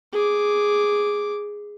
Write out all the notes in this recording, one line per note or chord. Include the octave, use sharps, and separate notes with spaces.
G#4 D6